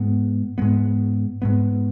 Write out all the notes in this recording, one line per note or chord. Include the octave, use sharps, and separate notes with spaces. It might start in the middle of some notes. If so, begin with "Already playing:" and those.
Already playing: G#2 G#3 B3
G#2 G#3 B3
G#2 G#3 B3